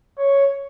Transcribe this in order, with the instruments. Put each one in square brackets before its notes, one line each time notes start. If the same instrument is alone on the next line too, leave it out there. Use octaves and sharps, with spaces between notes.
[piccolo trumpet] C#5